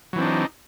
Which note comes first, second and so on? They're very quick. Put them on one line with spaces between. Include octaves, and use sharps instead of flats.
F#3 E3 C4 D4 D#4